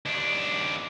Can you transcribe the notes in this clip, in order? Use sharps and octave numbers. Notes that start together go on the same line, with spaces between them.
D#2 D4